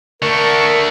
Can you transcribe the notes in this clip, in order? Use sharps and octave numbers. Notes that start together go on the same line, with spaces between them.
D3 A3 A#4 C#6